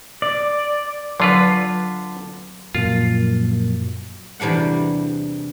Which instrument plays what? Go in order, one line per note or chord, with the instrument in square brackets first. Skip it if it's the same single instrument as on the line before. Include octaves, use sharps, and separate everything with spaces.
[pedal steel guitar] D5
[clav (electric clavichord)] D3 F4 B4 [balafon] F#3
[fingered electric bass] F#2 A#2 F3 [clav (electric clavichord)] F4
[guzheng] E2 C3 G3 D4 F#5